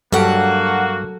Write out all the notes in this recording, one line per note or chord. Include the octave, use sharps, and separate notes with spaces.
G2 F#3 A#3 D4 F#4 G4 A4 F#5